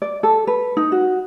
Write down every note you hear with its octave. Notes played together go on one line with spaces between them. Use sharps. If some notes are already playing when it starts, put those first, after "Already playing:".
D5
A4
B4
D#4
F#4